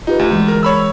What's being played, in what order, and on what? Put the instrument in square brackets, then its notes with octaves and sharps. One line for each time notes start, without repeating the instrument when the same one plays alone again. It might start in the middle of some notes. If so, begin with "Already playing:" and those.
[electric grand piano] D#4 [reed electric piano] F4 G4 B4
[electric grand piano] D2
[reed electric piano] E3 G#3
[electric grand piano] A#4
C#5 B5 E6